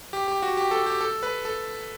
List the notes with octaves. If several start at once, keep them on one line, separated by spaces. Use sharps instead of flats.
G4
G4
F#4
G4
A4
G4
A4
B4
A4